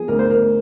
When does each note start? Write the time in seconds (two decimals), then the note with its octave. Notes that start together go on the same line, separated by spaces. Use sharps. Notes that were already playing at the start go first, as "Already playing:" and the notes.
Already playing: F3 G#4
0.08 D2 A#4
0.19 C5
0.31 A#4